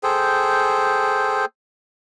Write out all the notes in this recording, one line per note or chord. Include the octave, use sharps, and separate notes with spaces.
G#4 A4 C5 G5